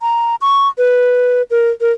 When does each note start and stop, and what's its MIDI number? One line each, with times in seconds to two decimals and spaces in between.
0.01 0.35 82
0.41 0.68 85
0.78 1.42 71
1.50 1.70 70
1.81 1.92 70